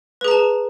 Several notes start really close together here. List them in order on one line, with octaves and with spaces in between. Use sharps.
B4 G#4 A#5 A5